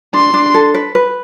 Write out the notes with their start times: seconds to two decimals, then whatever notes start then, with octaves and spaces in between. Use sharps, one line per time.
0.14 D4 C6
0.34 D4
0.54 A4
0.74 B4
0.95 B4